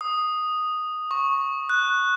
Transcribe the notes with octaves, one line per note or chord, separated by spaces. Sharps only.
D#6
C#6
F#6